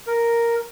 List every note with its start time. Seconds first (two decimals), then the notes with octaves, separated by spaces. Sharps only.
0.07 A#4